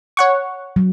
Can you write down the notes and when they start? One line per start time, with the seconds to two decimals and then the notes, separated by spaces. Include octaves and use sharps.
0.17 C#5 F#5 C#6
0.76 F#3